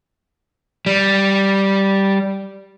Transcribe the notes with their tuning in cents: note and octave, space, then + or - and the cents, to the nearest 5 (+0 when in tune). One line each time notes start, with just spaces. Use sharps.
G3 -5